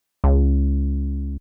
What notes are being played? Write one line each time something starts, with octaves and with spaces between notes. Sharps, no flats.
C#2